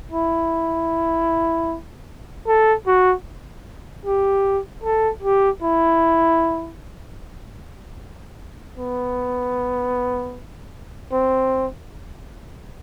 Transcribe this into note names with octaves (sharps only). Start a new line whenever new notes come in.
E4
A4
F#4
G4
A4
G4
E4
B3
C4